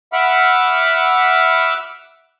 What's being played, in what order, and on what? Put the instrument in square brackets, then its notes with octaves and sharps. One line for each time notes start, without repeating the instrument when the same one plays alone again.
[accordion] E5 F#5 B5 D6 E6 F6